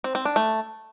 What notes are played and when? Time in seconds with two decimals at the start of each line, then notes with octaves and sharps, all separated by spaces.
0.04 C4
0.15 C4
0.25 D4
0.36 A3